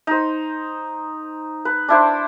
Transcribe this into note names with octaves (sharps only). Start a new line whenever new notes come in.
D#4 C5
B4
D4 E4 C5